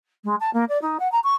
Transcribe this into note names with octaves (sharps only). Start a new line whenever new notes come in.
G#3
A5
A#3
D5
D#4
F#5
A#5
C#6